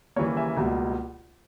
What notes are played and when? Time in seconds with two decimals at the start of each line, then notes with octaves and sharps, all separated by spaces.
0.16 D#2 C#3 E3 G3 A#3 C#5
0.37 E5 G#5
0.57 C#2 B2 G3 A#3